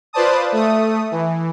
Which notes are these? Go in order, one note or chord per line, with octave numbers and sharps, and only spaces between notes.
F4 B4 C5 D5 A5 D#6
A3 D#6
E3